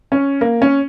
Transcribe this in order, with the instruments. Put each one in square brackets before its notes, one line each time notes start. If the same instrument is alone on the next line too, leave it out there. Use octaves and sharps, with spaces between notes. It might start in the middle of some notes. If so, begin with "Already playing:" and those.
[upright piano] C#4
A#3
C#4